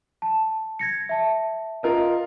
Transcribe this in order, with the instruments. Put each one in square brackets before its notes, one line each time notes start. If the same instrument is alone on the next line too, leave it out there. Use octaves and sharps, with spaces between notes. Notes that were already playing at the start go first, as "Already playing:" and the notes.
[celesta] A5
G#6 A#6 C#7
E5 A5
[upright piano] F4 A#4 D#5